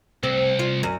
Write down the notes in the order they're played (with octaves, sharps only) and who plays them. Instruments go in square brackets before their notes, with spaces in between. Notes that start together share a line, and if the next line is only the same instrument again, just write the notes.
[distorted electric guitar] C2 [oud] C4
[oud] F4
F#2